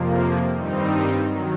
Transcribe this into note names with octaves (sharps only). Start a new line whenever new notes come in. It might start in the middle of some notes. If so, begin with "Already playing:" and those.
Already playing: F2 C3 F3 A#3
G2 D#3 G3 C4 D#4
D#3 F#3